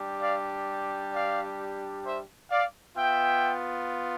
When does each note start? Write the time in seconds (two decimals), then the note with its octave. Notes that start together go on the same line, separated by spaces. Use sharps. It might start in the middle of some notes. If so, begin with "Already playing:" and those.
Already playing: G3 D4 G4
0.20 D5 F5
1.12 D5 F5
2.04 C5 E5
2.51 D5 F5
2.97 B3 F4 E5 G5